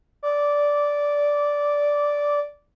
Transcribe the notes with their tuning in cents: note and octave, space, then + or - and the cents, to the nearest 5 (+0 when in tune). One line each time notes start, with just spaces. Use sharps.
D5 -10